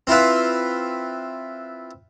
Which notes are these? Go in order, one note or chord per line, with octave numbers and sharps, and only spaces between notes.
C4 E4 F4 B4